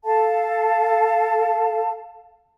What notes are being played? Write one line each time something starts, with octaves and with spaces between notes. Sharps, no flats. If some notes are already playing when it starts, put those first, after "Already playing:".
A4 F5 A5